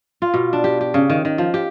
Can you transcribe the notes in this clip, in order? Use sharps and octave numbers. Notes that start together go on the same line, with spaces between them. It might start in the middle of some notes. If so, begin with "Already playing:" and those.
F4
B2
D4
G4
G4
C#3
D#3
D#3
F3
G4